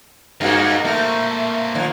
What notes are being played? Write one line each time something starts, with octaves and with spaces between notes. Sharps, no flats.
G2 A#3 F#4 D#5 F5
A3 A#3 C4 A#4
A#2 D#3 F3